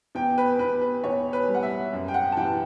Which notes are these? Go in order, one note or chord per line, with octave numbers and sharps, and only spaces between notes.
E2 G5
B4
E2 B4
B4
E2 C#5
B4
G3
F#5
E5
F#2
G5
F#5
A5
E3 G5